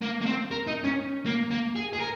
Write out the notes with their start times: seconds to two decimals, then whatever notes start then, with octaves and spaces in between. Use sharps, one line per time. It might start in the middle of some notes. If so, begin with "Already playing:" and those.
0.02 A#3
0.22 A#3
0.26 C4
0.51 A#4
0.67 D#4
0.84 C#4
1.26 A#3
1.51 A#3
1.76 G#4
1.93 G#4
2.00 A#4